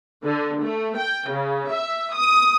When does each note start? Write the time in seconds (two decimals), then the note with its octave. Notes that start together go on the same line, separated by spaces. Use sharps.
0.23 D3
0.62 A3
0.98 G5
1.29 C#3
1.72 E5
2.15 D#6